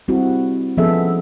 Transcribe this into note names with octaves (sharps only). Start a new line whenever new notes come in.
G3 C4 E4 F#4
F3 B3 C#4 G#4 A4 E5